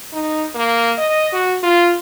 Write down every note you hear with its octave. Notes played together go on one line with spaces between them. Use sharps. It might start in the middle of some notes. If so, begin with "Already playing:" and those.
D#4
A#3
D#5
F#4
F4